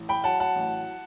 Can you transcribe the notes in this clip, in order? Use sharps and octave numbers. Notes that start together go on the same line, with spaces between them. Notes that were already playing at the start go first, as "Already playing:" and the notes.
Already playing: A1
G5 B5
F#3 F#5 A5
F#5 A5
A1